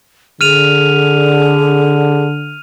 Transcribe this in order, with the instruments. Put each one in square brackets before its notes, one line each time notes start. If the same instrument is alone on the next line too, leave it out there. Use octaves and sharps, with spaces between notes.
[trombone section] D3 [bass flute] G#4 [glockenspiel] F6 D#7 F7